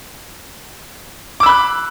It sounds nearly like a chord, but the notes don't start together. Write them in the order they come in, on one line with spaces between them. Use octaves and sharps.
D6 E6 B5 F#6